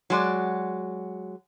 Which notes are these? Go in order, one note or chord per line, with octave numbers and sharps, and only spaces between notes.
F#3 G#3 D5